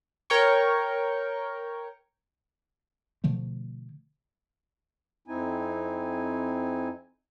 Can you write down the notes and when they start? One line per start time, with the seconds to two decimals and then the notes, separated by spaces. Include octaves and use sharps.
0.30 A#4 C#5 G5 C#6
3.24 B2 D3 F3 A3
5.28 F2 C4 D#4 E4 G#5